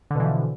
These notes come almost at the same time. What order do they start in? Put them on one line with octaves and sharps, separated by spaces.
D3 B2 E3 F3